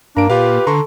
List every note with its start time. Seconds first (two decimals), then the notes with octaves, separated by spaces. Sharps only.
0.17 G2 A#3 D4 A#5 D7
0.30 A#2 F4 G4 B4 F5
0.67 D3 A4 A#5 C6 C#6